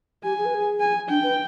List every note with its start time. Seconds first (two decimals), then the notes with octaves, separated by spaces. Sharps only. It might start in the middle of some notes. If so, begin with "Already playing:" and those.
0.24 G4 G#5
0.38 G#4
0.45 B4
0.55 G#4
0.81 G#5
1.09 D4 G5
1.23 B4